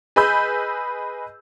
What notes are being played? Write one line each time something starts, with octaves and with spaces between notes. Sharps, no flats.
G#4 B4 D#5 B5 E6 G6